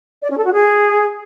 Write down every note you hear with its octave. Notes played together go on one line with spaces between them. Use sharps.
D5
C#4
A4
F#4
G#4